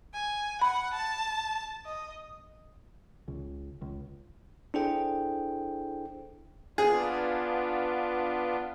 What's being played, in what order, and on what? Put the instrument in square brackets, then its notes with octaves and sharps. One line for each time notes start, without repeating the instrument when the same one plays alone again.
[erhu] G#5
[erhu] F#5 [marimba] B5
[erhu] A5
D#5
[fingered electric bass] C#2
C#2
[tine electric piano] D4 E4 G#4 A4 C5 G5
[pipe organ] B3 D4 F4 [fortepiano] G#4